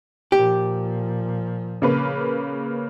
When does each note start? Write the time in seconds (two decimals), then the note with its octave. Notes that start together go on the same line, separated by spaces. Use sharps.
0.32 A#2 F3 G4
1.82 C#3 A#3 B4